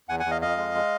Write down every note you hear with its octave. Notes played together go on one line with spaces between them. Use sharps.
E2 F#5 G#5
F#5 G#5
E2
D#5 F5
F2 D#5 F5
G#3
G#3